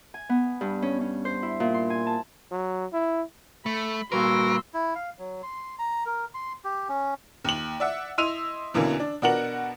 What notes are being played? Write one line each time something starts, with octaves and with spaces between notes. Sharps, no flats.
G#5
B3
G2
C#4
C#4
C5
E4
A#2
C6
G#5
A5
F#3
E4
A3 B5
A#2 G3 F#4 A#4 B4 C6 E6
E4
F5
F#3
C6
A#5
A#4
C6
G4
C#4
D#2 F#7
D5 E5 F#5
E4 D#5 C6 E6 D#7 F7
E2 B2 D3 E3 A#3 C#4
D4
B2 D4 F#4 A#4 F#5 F#7